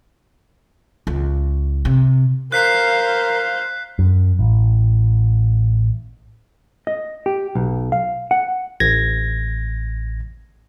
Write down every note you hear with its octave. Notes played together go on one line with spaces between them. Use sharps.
C#2
C3
A#4 C5 F5 F#6 B6 C7
F#2
A1
D#5
G4
B1
F5
F#5
A1 G#6 A#6